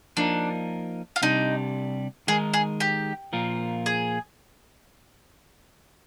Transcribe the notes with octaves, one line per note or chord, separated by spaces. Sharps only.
F3 A#3 D4 D#4 A#4
F4
C3 G3 D4 D#4
D#3 G#3 D#4 G#4 A#4
G#4
G4
A#2 F3 A#3 F4 A#4
G#4